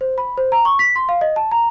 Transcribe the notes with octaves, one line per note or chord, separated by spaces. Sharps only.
C5
B5
C5
A#5
C#6
B6
C6
F5
D#5
A5
A#5